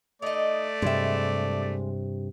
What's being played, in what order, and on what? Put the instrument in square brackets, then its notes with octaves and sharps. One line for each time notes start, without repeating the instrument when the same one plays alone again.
[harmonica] A3 D5 [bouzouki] D#4 D#5
[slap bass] G2 C3 [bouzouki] G#3 E5